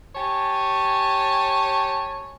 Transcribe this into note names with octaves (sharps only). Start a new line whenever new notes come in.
G4 C#5 G#5 A5